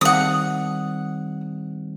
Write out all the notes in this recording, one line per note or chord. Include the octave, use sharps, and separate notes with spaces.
D#3 G3 C4 F#5 D#6